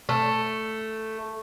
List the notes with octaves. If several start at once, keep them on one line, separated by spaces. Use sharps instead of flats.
A3